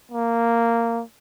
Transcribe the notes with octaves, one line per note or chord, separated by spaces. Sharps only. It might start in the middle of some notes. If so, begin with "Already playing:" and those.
A#3